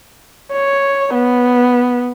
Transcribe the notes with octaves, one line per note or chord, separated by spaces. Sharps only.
C#5
B3